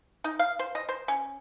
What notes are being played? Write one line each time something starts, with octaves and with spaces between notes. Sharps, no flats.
D#4
F5
C5
D#5
C5
C#4